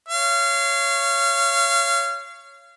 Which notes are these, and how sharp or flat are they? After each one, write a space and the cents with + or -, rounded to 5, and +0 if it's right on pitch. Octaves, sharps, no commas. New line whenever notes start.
C#5 +0 F5 -30